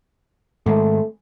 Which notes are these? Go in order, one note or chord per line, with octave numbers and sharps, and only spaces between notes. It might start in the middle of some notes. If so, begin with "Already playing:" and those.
G#2 D#3 G#3 A3